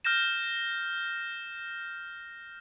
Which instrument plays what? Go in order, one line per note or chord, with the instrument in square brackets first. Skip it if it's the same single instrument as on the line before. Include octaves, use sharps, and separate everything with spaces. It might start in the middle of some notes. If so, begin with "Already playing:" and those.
[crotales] F6 G6 A#6 E7